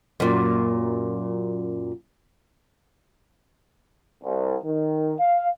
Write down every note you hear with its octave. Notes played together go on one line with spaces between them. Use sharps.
F#2 A#2
C2
D#3
F5